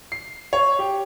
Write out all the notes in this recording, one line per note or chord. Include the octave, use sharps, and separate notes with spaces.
C7
C#5
G4